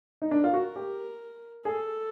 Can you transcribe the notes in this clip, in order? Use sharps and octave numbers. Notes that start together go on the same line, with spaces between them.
D#4
D4 A#4
F4
F#4
G4
G#4 A4